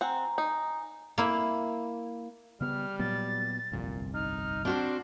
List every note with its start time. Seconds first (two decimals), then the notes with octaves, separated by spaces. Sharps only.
0.01 C4 F#5 G#5 A#5
0.38 D#4
1.18 A#3 E4
2.61 C#3 G3 B3 F6
2.99 A#2 F#3 B3 A6
3.72 G1 C2 F2 A#2
4.14 D#4 F6
4.65 C4 D4 F#4 C5